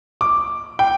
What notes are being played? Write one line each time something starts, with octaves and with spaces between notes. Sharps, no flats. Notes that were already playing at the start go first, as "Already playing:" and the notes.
D6
G5